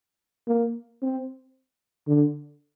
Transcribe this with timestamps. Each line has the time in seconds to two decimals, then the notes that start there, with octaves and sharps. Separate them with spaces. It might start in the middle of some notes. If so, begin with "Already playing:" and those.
0.48 A#3
1.02 C4
2.08 D3